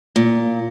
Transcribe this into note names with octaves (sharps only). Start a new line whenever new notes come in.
A#2